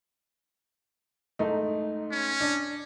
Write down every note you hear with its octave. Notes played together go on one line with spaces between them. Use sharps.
G#2 A3 D#4
C#4
D4